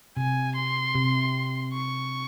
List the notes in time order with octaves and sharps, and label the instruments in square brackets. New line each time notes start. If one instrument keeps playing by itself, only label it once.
[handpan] C3 [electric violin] G#5
[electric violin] C6
[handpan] C3
[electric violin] C#6